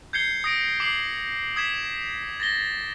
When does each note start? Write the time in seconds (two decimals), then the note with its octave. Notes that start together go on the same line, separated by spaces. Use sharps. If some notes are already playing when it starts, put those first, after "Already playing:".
0.13 G6 G#6 C7 C#7 G7
0.44 D#6 A#6 D7
0.80 D6 C7 F#7
1.56 D#6 G#6 B6 E7
2.40 A6 A#6 G7